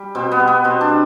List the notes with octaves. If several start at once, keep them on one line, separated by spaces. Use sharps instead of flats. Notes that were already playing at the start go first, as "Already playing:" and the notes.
Already playing: G3
B2 C4
B3
G3
B3
B2 C4
D4
G3